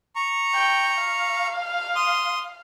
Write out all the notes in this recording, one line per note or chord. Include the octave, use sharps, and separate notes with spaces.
A#5 C#6
G5
F5
C6 D#6